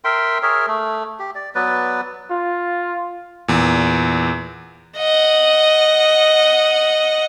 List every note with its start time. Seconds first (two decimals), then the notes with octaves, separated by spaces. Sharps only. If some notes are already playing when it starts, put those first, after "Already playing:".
0.04 A#4 E5 G5 C6
0.43 G#4 A#4 C#5 E5
0.67 A3
1.20 G4
1.35 D5
1.55 F#3 B3 B4 D5
2.31 F4
3.48 E2 A#2
4.97 D#5 F#5